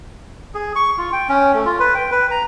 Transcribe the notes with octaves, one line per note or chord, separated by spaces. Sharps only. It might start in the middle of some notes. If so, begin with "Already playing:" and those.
G#4
C#6
F4
G5
C#4
A3
F4
B4
G5
B4
A#5